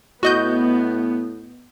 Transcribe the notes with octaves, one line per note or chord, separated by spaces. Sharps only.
A2 B3 F#4 D#5 G6